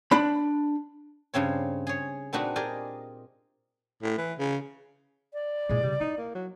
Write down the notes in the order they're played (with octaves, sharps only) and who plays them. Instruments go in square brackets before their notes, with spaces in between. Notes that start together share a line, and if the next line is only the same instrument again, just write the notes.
[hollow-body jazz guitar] D4 B5
[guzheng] G2 C#3 C4 C#5
G#4 C#5
A#2 C4 D4 D#4 F#4 B4
G4 G#4 A#4 D5 D#5
[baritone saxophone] A2
E3
C#3
[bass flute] D5
[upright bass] A#2 E4 [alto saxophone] G#3
[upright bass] C#3 [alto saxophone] G3
[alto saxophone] D#4 [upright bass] E4
[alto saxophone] A#3
F#3